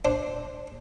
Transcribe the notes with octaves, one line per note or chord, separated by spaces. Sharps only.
D4 C5